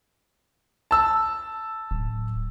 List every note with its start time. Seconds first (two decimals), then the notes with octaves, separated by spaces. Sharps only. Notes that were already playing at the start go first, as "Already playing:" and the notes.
0.91 A5 E6
1.91 D1